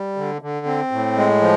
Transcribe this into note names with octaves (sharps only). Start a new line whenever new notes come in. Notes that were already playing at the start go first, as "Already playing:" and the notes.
Already playing: G3
D3
D3
C4
A2
G#3
F3